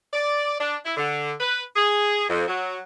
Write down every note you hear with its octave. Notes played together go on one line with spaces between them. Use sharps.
D5
D4
E4
D3
B4
G#4
F2
F#3